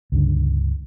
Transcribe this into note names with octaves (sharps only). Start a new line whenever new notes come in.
C#2 G2 D3